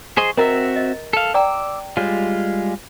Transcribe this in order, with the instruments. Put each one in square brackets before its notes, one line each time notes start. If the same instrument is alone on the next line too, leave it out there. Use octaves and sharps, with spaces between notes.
[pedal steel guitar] G#4 C5 D#5 [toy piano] C#6
[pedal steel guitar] C4 F#4 E5 [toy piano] A#4 D#5 A#5
[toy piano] D#5
[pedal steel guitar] A4 F5
[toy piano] D5 G5 A#5 [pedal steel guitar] D6 E6
[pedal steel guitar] G3 G#3 F4 [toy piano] C#5